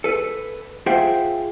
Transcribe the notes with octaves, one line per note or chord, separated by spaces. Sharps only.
A4 B4
F4 G#4 C5 E5 F#5 G5